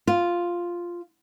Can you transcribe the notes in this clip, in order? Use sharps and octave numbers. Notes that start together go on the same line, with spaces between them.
F4